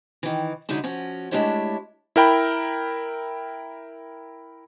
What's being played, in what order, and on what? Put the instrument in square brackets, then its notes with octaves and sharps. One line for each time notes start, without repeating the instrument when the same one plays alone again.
[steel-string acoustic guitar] D#3 E3
D3 F#3 G#3 D#4 E4
F3 C#4 F#4
G#3 A3 D4 E4 G4 C#5
[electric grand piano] E4 A#4 G5 B5